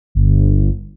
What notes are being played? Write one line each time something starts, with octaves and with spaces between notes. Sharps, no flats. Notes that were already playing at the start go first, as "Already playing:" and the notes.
G1